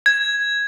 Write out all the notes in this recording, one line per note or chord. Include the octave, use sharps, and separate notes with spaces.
G#6